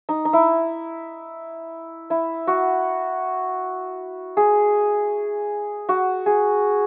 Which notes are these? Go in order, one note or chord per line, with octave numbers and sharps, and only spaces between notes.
D#4
D#4
E4
E4
F#4
G#4
F#4
G#4